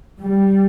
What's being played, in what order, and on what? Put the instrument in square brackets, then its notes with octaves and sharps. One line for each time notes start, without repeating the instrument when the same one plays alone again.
[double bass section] G3